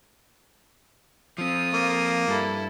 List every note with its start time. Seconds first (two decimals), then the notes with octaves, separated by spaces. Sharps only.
1.38 F3 C4 F4 D#6
1.74 A#3
2.28 G2 E4 A4